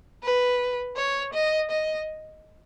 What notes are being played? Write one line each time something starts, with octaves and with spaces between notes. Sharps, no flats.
B4
C#5
D#5
D#5